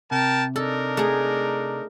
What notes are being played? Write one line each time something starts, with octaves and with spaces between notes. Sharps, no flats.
C3 A#4 G5 A5
D4 D#4 A4 A#4
A3 G#4